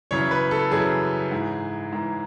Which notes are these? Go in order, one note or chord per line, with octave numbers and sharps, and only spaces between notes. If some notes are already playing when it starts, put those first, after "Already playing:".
F#2 C#3 E3 C#5
B4
A4
F#2 C#3 E3 G#4
G#2 E3
G#2 E3